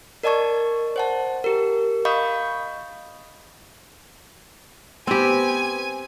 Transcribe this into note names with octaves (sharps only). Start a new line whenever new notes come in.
A#4 D5 D#5 A5 C#6 G#6
C5 F#5 A5
G4 A#4
D#5 F5 B5 C#6 D#6 G6
B3 C4 G4 C5 G#5